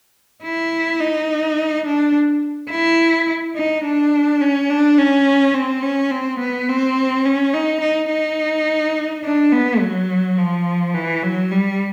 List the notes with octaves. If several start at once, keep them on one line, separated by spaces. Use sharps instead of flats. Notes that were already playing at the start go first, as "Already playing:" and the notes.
E4
D#4
D4
E4
D#4
D4
C#4
D4
C#4
C4
C#4
C4
B3
C4
C#4
D#4
D#4
D#4
D4
B3
F#3
F3
E3
F#3
G3